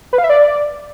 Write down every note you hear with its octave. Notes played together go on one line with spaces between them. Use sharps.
B4
F5
E5
D5